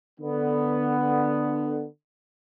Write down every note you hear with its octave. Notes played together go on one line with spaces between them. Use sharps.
D3 B3